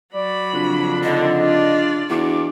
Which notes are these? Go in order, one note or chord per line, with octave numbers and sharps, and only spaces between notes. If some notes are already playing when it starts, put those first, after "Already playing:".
F#3 D5 B5
F2 C#3 F3 D4
D3 D#4 D#5
F4 D5
E2 D4 F#4 C#6 D6